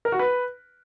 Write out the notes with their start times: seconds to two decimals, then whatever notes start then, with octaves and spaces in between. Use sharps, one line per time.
0.05 A#4
0.12 F#4
0.19 B4